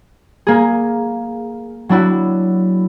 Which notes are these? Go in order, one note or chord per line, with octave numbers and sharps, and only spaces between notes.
A#3 G#4
F#3 D4 E4 F#4